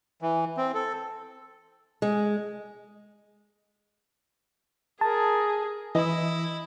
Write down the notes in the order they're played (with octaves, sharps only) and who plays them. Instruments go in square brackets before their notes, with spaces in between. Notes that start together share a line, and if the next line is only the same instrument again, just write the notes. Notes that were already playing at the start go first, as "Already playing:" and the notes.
[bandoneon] E3
C4
A4
[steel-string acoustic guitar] G#3
[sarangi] G#4 [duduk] A#4 [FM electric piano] A5
[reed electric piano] E3 [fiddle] E4 [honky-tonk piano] D#5